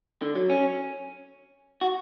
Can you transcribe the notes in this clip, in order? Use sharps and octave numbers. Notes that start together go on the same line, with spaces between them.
D3
F#3
C#4
F#4